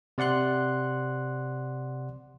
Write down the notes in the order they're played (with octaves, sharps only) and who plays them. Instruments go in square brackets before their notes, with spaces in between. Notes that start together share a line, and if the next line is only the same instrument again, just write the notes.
[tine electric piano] C3 D5 F#5 C6 F#6